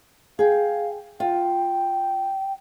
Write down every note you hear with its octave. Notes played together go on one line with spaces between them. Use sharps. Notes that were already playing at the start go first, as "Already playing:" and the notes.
G#4 F5 G5
F4 G5